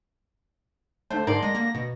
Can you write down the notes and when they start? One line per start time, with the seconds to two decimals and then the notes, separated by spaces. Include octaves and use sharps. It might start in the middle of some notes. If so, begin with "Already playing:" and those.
1.10 D3 A3 C5
1.27 G#2 D3 A#4 D5 C6
1.42 G#3 A#6
1.55 A#3
1.74 B2